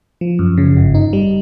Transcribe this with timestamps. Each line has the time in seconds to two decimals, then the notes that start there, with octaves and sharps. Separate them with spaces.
0.21 F3
0.39 F#2
0.58 C#3
0.77 G1
0.94 D#4
1.13 G3